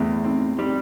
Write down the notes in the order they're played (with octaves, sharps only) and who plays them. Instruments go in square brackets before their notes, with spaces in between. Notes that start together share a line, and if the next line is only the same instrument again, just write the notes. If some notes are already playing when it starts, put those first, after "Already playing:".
Already playing: [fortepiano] E2 [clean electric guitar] A2
[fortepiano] C4
[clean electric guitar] G3 [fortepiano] C4